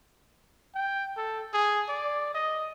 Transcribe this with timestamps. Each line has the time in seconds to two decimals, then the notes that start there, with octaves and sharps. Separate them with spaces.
0.75 G5
1.17 A4
1.54 G#4
1.89 D5
2.34 D#5